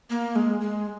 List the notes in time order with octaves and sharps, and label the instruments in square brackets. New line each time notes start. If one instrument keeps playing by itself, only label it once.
[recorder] A#3
G#3
G#3